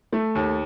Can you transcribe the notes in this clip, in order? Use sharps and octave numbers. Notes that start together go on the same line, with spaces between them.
A3
D#2